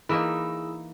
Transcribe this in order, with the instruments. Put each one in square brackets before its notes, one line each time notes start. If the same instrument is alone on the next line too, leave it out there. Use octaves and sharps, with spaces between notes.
[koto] E3 A#3 D#4 [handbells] E4 G#4 E6